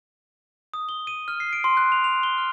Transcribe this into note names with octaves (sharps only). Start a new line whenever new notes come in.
D#6
G7
D#7
F6
C7
D7
C6
F#6
F7
F7
G7
F6